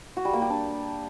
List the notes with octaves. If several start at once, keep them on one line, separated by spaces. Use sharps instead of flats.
F#4
G3
A#3
G4
D4